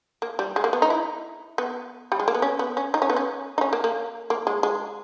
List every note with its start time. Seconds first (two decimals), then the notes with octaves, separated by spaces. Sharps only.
0.22 A#3
0.39 G3
0.56 G#3
0.64 A#3
0.73 B3
0.82 D#4
0.90 E4
1.58 B3
2.12 G3
2.19 G#3
2.28 A#3
2.34 B3
2.42 C#4
2.59 B3
2.77 C#4
2.94 D#4
3.02 C#4
3.10 B3
3.16 C#4
3.58 D#4
3.61 C#4
3.73 A#3
3.84 A#3
4.30 A#3
4.47 G#3
4.63 G#3